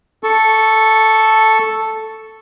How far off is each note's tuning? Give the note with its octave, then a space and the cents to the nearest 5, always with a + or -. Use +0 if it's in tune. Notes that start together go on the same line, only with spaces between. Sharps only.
A4 +0 C#6 +0